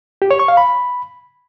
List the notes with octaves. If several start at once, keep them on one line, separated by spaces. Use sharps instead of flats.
G4
C#5
C#6
F5
B5